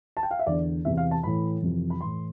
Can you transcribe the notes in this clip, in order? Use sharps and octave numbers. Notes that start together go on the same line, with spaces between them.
A5
G5
F5
E5
E2 D3 D5
E2 C3 E3 E5
F5
A5
A2 E3 B5
F2 C3 E3
B5
A2 E3 C6